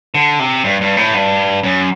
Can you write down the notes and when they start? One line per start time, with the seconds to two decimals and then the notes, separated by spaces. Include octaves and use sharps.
0.14 D3
0.39 C3
0.64 G2
0.81 G2
0.97 A2
1.14 G2
1.63 F#2